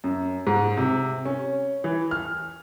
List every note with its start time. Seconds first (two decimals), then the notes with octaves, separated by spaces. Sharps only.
0.04 F#2
0.47 G#2
0.77 C3
1.25 C#4
1.84 E3
2.11 F6